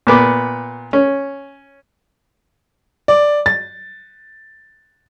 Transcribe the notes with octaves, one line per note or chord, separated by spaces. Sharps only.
A#2 B3 D6
C#4
D5
A6